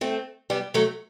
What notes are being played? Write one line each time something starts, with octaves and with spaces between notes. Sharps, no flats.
A3 C4
G3 B3
F#3 A3